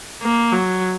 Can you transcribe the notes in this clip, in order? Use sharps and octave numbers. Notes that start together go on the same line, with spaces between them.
A#3
F#3